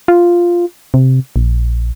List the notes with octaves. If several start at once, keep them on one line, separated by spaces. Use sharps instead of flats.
F4
C3
A#1